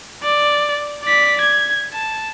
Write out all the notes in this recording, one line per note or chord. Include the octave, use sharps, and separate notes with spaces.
D5
D5 B6
G#6
A5